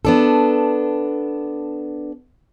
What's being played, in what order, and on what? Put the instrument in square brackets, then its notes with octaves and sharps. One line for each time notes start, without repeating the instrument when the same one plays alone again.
[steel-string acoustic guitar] B3 D4 A4